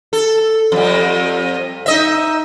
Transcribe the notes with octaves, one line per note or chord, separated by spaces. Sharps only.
A4
F2 G3
D#4 D#5 E5